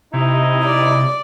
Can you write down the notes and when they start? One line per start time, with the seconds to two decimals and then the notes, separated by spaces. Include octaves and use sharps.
0.14 C3 D#4 E4 D#5
0.64 D5